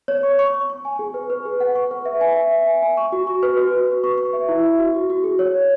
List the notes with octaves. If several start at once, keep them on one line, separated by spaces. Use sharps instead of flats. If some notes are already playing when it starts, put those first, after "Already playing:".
C#5
C#6
C#6
C#6
C#6
G#5
G#4
B4
B4
G#4
F#5
C#6
B4
E5
G#5
E5
E5
G#5
G#5
C#6
F#4
C#6
B4
F#4
F#4
B4
C#6
C#6
E5
E4
E5
F#4
F#4
F#4
G#4
C#5
C#5